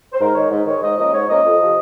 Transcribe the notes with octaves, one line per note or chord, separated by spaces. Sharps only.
C5
G#2 A#4
D#3 G#3 C#5
G#2
D#3 G#3 C#5
G#2 D#5
F3 A#3 C#4 D#5
G#2 C#5
F3 A#3 C#4 D#5
F2
C3 F3